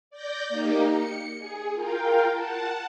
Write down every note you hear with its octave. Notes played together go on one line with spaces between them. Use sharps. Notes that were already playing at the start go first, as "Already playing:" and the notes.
D5 G6 A#6
A#3 D#4 G4
C#7
G#4
F4 A#4 F5 G5
F#5 A5